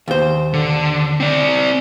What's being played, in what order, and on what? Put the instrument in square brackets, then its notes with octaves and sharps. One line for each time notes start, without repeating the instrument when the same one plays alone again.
[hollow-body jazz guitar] D#2 C5
[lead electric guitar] D3
C4 D5